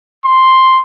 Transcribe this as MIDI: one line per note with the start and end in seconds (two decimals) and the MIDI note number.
0.25 0.81 84